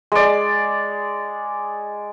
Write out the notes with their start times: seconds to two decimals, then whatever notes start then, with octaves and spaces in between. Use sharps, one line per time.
0.12 G#3 D5